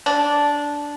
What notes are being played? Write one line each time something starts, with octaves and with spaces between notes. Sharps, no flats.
D4